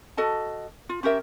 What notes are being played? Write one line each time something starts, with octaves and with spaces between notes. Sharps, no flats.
F#4 A4 D#5 A5
F4
C#4 G4 A#4 E5